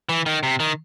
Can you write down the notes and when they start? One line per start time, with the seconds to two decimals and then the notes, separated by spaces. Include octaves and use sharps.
0.09 E3
0.26 D#3
0.43 C3
0.60 D#3